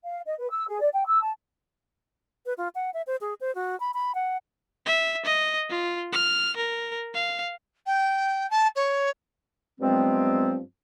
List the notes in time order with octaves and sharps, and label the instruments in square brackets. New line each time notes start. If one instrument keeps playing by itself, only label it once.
[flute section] F5
D#5
B4
E6
G#4
D5
G5
E6
A5
[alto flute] B4
F4
F#5
E5
C5
G#4
C5
F#4
B5
B5
F#5
[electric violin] E5
D#5
F4
F6
A#4
F5
[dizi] G5
A5
C#5
[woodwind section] G2 F3 F#3 G#3 B3 C4